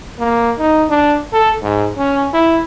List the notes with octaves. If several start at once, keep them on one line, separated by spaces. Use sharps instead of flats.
A#3
D#4
D4
A4
G#2
C#4
E4